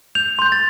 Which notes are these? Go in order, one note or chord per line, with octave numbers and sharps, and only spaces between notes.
G6 F7
C6 G6
A6